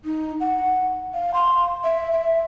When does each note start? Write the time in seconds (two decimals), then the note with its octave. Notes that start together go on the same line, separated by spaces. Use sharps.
0.05 D#4
0.40 F#5
1.14 F5
1.34 C6
1.84 E5
2.12 E5